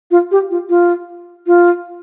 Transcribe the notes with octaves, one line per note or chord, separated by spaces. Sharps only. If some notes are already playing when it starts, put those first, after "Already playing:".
F4
G4
F4
F4
F4